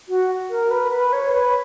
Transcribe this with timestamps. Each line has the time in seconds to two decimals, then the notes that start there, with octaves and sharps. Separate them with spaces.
0.08 F#4
0.50 A#4
0.71 B4
0.92 B4
1.13 C#5
1.33 B4